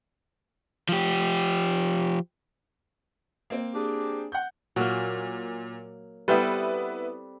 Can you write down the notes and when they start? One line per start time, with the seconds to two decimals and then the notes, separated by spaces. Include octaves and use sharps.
0.89 F3 G4
3.50 A#3 C4
3.75 D4 G4 G#4
4.32 F#5 G6
4.76 A#2 F#3 A#3
6.28 G3 B3 C4 E4 A4 B4